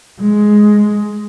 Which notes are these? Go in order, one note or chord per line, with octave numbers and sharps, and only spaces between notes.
G#3